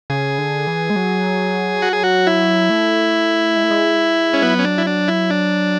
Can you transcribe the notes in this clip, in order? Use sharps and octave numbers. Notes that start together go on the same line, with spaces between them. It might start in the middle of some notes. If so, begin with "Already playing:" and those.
C#3 G#4
D3
E3
G#3
F#3
F#4
G#4
F#4
E4
A3
G#3
A3
G#3
C#4
F#3 B3
C#4
D4
E4
D4
E4
D4